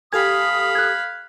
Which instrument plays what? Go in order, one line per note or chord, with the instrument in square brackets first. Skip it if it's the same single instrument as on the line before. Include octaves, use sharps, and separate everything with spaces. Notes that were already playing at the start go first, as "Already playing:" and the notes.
[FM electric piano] G4 A4 G#5 [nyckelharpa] F5 B5 [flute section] D#6 [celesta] G#6
[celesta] F#6 G#6